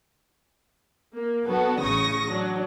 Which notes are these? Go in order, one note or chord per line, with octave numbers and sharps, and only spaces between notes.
A#3
F#3 B3 D4 F#4 A4
A1 C#3 C#6 D#6 A#6
F#3 D4